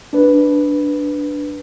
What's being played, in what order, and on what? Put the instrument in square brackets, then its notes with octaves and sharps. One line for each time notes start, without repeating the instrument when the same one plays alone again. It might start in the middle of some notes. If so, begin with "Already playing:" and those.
[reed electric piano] D4 B4